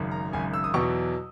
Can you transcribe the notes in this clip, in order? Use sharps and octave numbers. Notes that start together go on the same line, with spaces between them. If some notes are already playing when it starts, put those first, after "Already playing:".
Already playing: G#1 F#2 C#3
A#5
G#1 F#2 C#3 G#5
E6
D#6
E2 B2 F#3 C#6